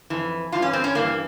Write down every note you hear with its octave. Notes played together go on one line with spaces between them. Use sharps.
F2 E3
G2 E3 F4
C#4
C4
C#4
G2 E3 A#3